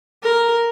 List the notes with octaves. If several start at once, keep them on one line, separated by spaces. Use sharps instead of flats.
A#4